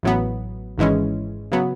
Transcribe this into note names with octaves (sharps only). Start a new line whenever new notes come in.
A1 A2 F#3 B3
G#1 G#2 E3 G#3 C#4
C#3 F#3 B3